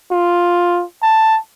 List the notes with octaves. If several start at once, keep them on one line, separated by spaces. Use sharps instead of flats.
F4
A5